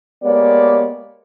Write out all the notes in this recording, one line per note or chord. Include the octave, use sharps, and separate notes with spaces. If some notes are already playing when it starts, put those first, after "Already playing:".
G#3 A#3 B3 G4 C#5 D5